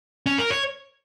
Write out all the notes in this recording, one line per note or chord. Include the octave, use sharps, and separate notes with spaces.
C#4
A#4
C#5